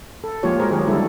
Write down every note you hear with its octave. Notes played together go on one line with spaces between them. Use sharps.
A4
F3 G#3 A#3 F4 G4 C#5
G#3 F#4 G#4 A#4 C5
D#3 F#3 A3 G4 G#4 C#5
D3 F#3 G3 D4 E4 A4